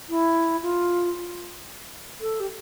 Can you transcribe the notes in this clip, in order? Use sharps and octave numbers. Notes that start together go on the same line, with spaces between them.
E4
F4
A4
G4